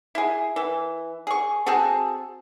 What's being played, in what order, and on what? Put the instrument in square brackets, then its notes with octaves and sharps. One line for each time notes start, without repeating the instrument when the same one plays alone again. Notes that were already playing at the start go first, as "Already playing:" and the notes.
[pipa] E4 G#4
E3
G#4 C#6
C4 F#4 G#4 A4